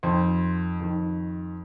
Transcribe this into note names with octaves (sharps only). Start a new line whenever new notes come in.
F2 D#3 C5
F2 D#3